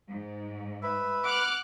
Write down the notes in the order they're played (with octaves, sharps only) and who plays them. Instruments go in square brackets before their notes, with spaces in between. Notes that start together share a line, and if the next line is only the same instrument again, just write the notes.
[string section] G#2
[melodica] B4 [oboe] E5
[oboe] F#5 [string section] D6 F6 F#6